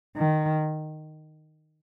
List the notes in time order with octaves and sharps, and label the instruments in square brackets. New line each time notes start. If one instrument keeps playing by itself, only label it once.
[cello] D#3